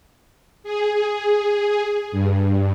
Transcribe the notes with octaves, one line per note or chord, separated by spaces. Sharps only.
G#4
G2